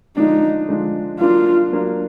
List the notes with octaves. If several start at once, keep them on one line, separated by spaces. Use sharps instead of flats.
D3 F3 G#3 D4 D#4
D3 F3 G#3 D4
F#3 A#3 D4 F4
F#3 A#3 D4